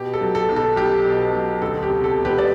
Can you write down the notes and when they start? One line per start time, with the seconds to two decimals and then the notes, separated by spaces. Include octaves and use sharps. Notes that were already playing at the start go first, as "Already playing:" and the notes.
Already playing: B2 G4
0.14 A4
0.21 F#3
0.35 A4
0.49 B1
0.56 A4
0.77 B1 G4
1.05 B2
1.33 F#3
1.62 D2 A4
1.83 G4
1.90 C3
2.04 A4
2.18 E1
2.25 G4 B4
2.38 D5